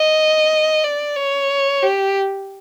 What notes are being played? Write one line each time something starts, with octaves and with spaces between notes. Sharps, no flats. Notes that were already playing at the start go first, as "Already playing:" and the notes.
Already playing: D#5
D5
C#5
G4